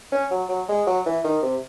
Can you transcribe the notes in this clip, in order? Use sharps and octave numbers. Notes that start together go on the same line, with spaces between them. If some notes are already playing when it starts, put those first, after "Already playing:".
C#4
F#3
F#3
G#3
F#3
E3
D#3
C3